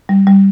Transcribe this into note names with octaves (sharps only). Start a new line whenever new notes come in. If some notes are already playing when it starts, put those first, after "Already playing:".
G3
G3